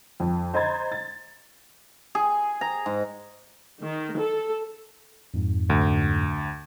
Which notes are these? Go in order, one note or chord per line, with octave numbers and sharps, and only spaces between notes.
F2
C5 D#5 A#5 B5 G#6 A6
A6
G#4
A#5
G#2
D#3
A4
F2 G#2
D2